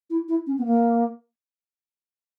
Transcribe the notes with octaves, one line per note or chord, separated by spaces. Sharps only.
E4
E4
C#4
B3
A#3